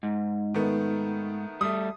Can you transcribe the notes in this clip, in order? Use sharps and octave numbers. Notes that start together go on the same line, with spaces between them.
G#2
D#3 A3 B3
G3 A3 D#6